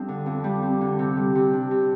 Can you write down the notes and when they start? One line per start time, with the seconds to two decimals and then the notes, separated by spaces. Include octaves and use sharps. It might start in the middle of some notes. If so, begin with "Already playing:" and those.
Already playing: F2 G3 C4 D4
0.08 D3
0.26 F2
0.44 G3
0.62 C4
0.81 D3
0.99 C3
1.17 G3
1.35 C3
1.53 D4
1.71 C3